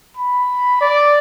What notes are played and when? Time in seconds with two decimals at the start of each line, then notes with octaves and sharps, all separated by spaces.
0.17 B5
0.81 D5